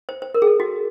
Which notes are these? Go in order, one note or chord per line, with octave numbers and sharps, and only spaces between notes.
C5
C5
A#4
G#4
A4
F#4